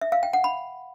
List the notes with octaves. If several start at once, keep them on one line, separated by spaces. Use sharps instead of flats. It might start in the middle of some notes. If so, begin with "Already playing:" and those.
E5
F5
G5
F#5
B5